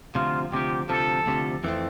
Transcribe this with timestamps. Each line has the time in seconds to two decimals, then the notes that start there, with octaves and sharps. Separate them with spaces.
0.15 D2 C3 F3 F4
0.52 D2 C3 F3 G4
0.89 D2 C3 F3 A4
1.26 D2 C3 F3
1.64 F2 E3 A3 C4